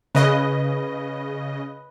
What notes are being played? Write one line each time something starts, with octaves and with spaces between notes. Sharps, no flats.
C#3 B4 D#5